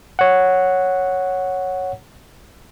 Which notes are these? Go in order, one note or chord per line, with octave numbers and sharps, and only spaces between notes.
C#5 F#5